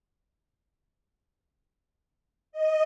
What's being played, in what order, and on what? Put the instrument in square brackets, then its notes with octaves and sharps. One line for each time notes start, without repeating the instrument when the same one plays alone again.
[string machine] D#5